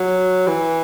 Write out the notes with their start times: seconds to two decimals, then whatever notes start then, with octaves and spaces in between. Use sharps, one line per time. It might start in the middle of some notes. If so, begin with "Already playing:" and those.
Already playing: F#3
0.47 E3